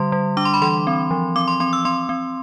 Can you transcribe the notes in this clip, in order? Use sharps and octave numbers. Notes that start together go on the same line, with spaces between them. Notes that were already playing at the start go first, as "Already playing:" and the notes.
Already playing: D3 G3 C6
G3
D4 D6
C6
B5
E3 C6
C4
F3
C4 D6
C6
C4 C6
E6
C4 C6
C4